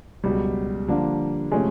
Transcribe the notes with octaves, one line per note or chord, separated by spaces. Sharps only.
C#2 B2 F#3 G3
D3 F3 A#3 D4
C3 F3 G#3 A3 C#4